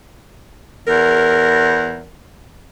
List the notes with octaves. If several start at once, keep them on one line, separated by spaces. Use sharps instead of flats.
E2 A#4